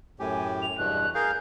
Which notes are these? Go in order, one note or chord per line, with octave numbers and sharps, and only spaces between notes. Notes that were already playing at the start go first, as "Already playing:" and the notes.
F#2 A2 G4 G#5
F7
E2 G2 B2 F#6
G#4 A#4 F5 G6